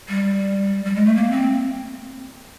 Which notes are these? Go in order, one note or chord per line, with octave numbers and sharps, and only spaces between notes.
G3
G3
G#3
A3
A#3
C4